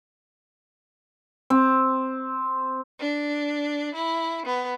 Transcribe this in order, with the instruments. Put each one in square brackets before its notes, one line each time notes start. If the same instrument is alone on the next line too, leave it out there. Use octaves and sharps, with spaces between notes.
[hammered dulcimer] C4
[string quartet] D4
E4
B3